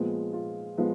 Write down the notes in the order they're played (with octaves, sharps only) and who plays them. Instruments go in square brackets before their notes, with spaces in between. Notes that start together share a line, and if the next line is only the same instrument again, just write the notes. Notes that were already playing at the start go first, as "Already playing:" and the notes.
Already playing: [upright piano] A#2 F3 G#3 B3
F4
F3 G#3 B3